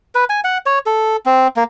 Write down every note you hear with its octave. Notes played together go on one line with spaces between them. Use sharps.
B4
G#5
F#5
C#5
A4
C4
A#3